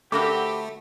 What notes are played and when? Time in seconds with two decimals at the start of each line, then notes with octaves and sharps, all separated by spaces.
0.12 D3 A3 C4 F#4 G4 A#4 B5 D6